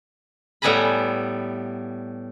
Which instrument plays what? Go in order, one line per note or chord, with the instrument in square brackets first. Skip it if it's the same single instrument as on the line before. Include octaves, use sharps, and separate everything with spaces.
[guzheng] A2 G3 B3 G#5 A#5 B5